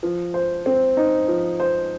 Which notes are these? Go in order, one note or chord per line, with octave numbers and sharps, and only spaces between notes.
F3
C5
C4
D#4
F3
C5